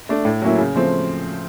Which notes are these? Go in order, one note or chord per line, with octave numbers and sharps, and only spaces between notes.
A3 D4
A2
F#3 A#3 C#4 E4
C#3
F3 A3 C4